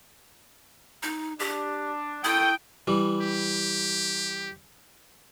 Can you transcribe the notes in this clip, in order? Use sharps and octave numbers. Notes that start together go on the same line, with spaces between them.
D#4
D4 G4
E4 A4 G5 C#6 D#6
E3 G3
G4